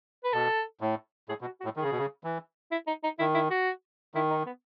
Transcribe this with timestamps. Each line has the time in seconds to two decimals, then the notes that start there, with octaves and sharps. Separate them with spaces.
0.24 B4
0.33 B2 A4
0.81 A2
1.29 A2 G#4
1.41 B2
1.45 F#4
1.61 F#4
1.64 A2
1.76 D#3 G#4
1.83 C#3
1.91 B2
1.98 C#3
2.24 E3
2.72 E4
2.87 D#4
3.04 D#4
3.19 D#3 E4
3.35 E4
3.51 F#4
4.14 D#3 E4
4.30 D#4
4.46 B3